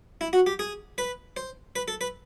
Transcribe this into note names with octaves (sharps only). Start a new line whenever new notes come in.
E4
F#4
G4
G#4
B4
C5
B4
A4
B4